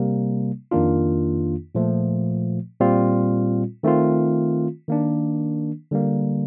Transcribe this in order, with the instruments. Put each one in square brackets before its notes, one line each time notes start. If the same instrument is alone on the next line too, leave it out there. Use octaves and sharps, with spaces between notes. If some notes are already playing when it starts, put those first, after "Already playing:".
Already playing: [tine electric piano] C3 G3 A#3
F2 D#3 A#3 D4 F4
A#2 F3 A3
A#2 G3 C4 F4
D#3 A3 C4 F4
D#3 A#3 D4
D3 G3 A#3